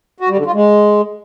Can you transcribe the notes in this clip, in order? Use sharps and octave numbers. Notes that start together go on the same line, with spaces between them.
F#4
G3
D3
F4
G#3